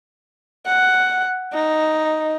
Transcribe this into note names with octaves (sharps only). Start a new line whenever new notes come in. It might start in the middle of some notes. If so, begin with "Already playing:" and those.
F#5
D#4